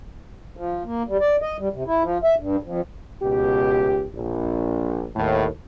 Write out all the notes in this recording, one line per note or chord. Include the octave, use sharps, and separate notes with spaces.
F3
A#3
G3
D5
D#5
G3
C3
E4
F3
E5
G2
F2
C#2 B2 G4
A#1
D#2 A2